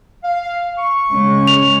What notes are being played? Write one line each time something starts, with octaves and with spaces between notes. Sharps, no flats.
F5
C#6
C#3 G#3 C#4
F7